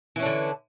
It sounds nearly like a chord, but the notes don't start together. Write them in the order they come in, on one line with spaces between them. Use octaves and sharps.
E3 C#4 D4 D3